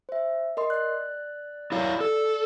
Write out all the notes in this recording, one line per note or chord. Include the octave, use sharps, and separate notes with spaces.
C5 E5
A#4 D#5 C6
D5 F#6
E4 C#5 F5
A4